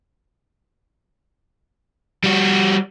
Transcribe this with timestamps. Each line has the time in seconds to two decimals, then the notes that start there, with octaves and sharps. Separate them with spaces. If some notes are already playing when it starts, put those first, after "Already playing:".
2.24 G3 F#4